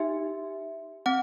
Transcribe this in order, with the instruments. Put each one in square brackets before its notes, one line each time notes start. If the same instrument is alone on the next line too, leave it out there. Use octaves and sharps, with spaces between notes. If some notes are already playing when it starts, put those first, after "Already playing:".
Already playing: [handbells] D#4 G4 E5
C4 F#5